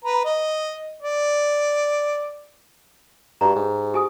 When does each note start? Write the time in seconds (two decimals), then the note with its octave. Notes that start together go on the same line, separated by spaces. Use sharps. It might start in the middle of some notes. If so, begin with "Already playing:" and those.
0.04 B4 A#5
0.25 D#5
1.02 D5
3.41 G2 G4 A#5
3.56 G#2
3.94 G4 G#5 D#6